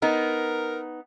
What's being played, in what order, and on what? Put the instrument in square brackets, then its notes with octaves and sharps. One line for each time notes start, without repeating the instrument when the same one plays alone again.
[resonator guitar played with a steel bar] B3 D#4 [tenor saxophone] A#4